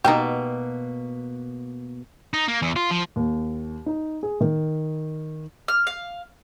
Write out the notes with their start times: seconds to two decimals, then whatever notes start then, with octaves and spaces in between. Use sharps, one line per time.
0.04 B2 A#3 D#4 G4 A5
2.33 D#4
2.48 A#3
2.62 E2
2.76 F4
2.91 F3
3.16 D#2
3.86 D#4
4.23 G#4
4.41 D#3
5.68 F6
5.87 F5